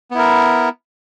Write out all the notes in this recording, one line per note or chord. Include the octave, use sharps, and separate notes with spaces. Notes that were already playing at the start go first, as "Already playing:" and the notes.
B3 E4 A#4